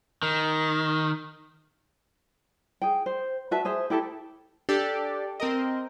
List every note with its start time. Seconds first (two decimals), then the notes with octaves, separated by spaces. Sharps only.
0.23 D#3
2.82 G#4 G5
3.06 C5
3.51 F#4 B4 E5 A5
3.65 G#4 C5 E5
3.90 E4 G4 A4 A5
4.69 D4 G4 A4 D5
5.40 C4 A#4 D#5